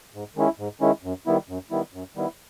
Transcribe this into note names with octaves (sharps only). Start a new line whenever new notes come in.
G#2
D#3 G#3 C#4 E4
G#2
D#3 G#3 C#4 E4
F#2
D#3 G3 B3 E4
F#2
D#3 G3 B3 E4
F#2
D#3 G3 B3 E4